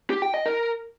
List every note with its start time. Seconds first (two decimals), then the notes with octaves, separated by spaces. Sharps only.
0.10 G4
0.22 G5
0.34 D#5
0.46 A#4